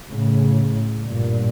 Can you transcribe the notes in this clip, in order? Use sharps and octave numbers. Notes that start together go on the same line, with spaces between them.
A2 C#3
G2 A#2